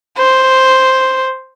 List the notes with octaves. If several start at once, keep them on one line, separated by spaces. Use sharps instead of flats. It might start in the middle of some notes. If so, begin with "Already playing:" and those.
C5